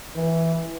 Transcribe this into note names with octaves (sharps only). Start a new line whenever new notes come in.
E3